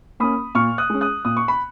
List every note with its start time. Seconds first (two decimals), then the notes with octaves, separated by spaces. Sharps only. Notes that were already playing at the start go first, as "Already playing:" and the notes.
0.20 A#3 C#4 B5 D#6
0.55 A#2 C#6 F6
0.78 D#6 F#6
0.90 G#3 C#4
1.01 D#6 F#6
1.25 A#2 D#6
1.37 C#6
1.48 B5